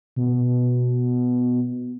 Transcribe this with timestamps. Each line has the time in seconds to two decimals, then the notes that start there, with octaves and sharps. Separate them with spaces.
0.16 B2